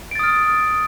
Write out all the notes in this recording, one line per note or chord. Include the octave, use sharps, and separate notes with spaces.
D#6 F6 A6 D7